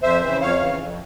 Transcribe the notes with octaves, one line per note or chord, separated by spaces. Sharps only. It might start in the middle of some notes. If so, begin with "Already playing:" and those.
F2 C5 E5
C#3 E3
F2 C#5 F5
C#3 E3
F2